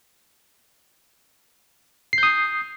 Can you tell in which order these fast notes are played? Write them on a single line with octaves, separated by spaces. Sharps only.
C7 G6 D#6